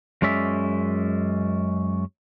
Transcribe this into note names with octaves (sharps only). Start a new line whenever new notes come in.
F#2 G#3 C#4 D5 E5